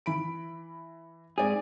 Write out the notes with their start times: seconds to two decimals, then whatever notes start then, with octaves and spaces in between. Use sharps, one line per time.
0.06 E3 B5 D7
1.38 G#2 C4 G#4 D5